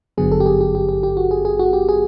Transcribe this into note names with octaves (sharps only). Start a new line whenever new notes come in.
G#1 G2 D3 F#3 B3 G#4
A4
G4
G#4
G4
G4
G4
G4
F#4
G#4
G#4
F#4
G4
G#4